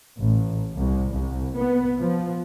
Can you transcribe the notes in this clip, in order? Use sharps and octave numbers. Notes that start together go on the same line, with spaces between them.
A1
C2
C2
B3
F3